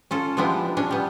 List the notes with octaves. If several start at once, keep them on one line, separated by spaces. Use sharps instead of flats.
C#4 F4 A4
F3 G3 G#3 B3 D4 E4
C#4 D4
G3 B3